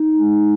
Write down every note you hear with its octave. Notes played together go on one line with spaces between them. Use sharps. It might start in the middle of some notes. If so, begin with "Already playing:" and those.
Already playing: D#4
G#3